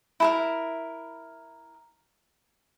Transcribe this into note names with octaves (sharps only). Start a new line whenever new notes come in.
E4 A4 A#4